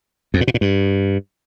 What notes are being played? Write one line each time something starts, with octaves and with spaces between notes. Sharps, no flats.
F2
A#2
B2
A#2
G2